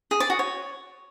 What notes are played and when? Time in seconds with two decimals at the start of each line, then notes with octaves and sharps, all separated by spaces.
0.11 G#4
0.20 D5
0.30 F#4
0.39 C#5